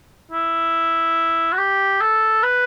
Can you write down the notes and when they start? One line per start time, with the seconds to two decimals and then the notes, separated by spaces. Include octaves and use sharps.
0.32 E4
1.53 F#4
1.58 G4
2.01 A4
2.43 B4